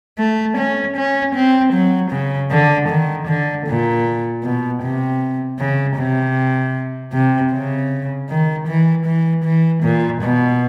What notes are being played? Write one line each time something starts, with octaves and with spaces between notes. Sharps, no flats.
A3
C#4
C#4
C4
F#3
C#3
D3
D#3
D3
A#2
B2
C3
C#3
C3
C3
C#3
D#3
E3
E3
E3
A#2
B2